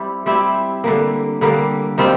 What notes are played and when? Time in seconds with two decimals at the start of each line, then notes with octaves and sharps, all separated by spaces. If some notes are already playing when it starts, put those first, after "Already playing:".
Already playing: G3 C4 E4 G4
0.26 G3 C4 E4 G4
0.84 D3 G3 A#3
1.41 D3 G3 A#3
1.98 D#3 G3 C4 F4